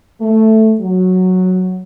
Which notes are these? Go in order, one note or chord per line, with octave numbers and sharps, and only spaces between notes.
A3
F#3